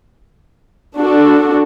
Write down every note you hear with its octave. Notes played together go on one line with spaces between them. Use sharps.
D4 F#4 A4